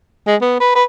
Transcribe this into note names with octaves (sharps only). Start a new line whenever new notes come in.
G#3
B3
B4
B4